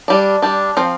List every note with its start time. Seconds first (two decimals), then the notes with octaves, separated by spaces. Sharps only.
0.08 G3 D4
0.42 G3 D4
0.77 F3 C4 F5